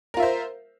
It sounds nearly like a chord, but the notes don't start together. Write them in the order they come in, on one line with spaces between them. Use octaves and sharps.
A#4 F4 E5 C5